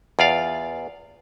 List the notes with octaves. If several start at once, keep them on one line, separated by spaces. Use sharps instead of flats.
E2 F4 D5 F5